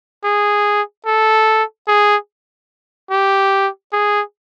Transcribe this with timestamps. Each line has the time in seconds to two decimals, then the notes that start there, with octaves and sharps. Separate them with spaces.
0.24 G#4
1.06 A4
1.88 G#4
3.11 G4
3.93 G#4